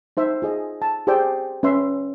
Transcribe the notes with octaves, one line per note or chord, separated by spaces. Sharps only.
D#4 C5 E5
F4 G#4 D#5
A5
G4 G#4 C5 D5 G5 E6
C#4 B4 E5 C6